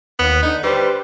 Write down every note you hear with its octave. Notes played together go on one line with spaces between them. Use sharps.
D#2 B3
D3 D#4
G3 G4 B4 C5